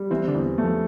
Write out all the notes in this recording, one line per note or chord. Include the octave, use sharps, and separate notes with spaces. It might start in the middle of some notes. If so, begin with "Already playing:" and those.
Already playing: G3
E3 C4 E4
D3 D4
E2
A3
F3